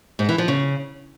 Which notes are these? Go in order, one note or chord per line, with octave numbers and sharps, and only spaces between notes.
G#2
E3
F3
C#3